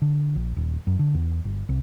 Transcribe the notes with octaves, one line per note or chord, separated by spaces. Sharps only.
D3
A#1
D#1
F#2
D3
E2
G1
C2